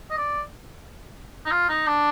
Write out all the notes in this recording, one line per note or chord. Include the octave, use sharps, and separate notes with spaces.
D#5
D5
D#4
F4
D#4
D4